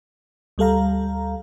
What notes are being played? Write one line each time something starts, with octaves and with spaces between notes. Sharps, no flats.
D2 G3 A4 F5 A#5